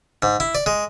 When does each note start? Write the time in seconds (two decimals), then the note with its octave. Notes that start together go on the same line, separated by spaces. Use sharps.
0.22 G#2
0.40 E4
0.55 D5
0.66 G#3